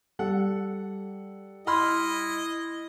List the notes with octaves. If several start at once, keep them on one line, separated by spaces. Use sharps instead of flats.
G3 A4 F#5
E4 D#5 B5 C6 F6